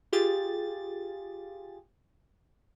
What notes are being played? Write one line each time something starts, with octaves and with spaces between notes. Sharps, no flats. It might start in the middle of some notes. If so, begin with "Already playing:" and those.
F4 G4 G#4 A6